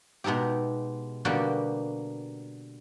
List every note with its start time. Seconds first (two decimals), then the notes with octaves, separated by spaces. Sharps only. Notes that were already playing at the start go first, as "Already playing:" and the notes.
0.24 B2 G#3 D#4 E4 G4
1.25 B2 D3 G3 A#3 F#4 G4